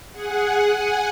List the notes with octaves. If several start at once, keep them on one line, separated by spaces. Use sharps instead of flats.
G#4 F#5
F#5 G#5